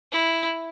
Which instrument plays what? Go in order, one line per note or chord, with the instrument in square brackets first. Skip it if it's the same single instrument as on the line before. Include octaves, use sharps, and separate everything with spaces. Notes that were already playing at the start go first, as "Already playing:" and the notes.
[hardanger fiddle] E4